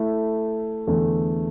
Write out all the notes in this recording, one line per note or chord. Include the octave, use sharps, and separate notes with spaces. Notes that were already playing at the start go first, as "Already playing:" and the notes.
Already playing: A3 E4 A4
E2 D3 A3